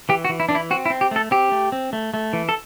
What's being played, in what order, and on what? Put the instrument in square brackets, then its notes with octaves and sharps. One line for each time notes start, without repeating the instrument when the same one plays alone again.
[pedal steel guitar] E3 G4
F#4
E3
E4
E3 D4
E4
C4 F#4
E4
C4
G4
A3 A4
C4 G4
A3
C4
A3
A3
E3
A4